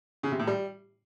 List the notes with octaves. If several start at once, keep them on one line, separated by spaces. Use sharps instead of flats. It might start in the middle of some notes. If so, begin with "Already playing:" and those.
C#3
C3
A2
G3